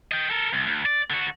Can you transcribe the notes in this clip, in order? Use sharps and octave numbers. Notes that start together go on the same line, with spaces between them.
D#5 G5
A4 A#4
C2
D2
D5
D3 F#4